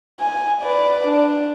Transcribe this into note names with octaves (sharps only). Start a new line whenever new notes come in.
G#5
B4 D5
D4